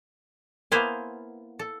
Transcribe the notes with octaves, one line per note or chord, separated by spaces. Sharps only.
A#3 B3 E4 C5 F5 G#5
A4